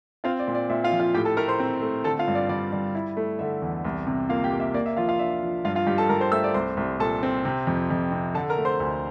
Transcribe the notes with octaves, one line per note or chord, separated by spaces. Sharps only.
C4 F4 F5
D5
A#2
D5
A#2 E5
F4 F5
F3
F4 F5
A2 G4 G5
A4 A5
A3 A#4 A#5
C5 C6
C4
A3
D3 A4 A5
F4 F5
G2
D5
G3 D5
G3
E4
A3
D3 E5
E2
C2
C3
A#3 F4 F5
G4 G5
A#3
E5
A#3 D5
E5
F3 F4 F5
F4 F5
D4 E5
F3
G2 F4 F5
F4 F5
G2 G4 G5
A4 A5
G2 A#4 A#5
C5 C6
A3 E5 E6
D5 D6
C2 C5 C6
C2
A#2 A4 A5
C4
C3
F2
F2
C3
D3 A4 A5
A#4 A#5
A3
C5 C6
D2